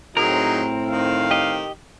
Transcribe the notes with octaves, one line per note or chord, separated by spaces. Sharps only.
A2 F#3 C4 D#4 G#4 A#4
D#3 F5
G4 D#5